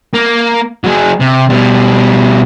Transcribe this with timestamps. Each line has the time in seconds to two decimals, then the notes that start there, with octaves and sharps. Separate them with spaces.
0.14 A#3
0.84 F#3 G#4
1.20 C3
1.50 B2 G3